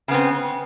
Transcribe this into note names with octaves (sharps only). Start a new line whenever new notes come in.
C#3 B3 C4